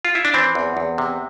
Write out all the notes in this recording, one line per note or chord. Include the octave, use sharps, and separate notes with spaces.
F4
E4
D4
E3 C4
E2
E2
C3